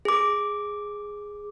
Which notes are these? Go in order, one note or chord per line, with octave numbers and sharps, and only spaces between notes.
G#4 D6